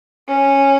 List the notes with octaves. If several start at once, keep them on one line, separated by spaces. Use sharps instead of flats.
C#4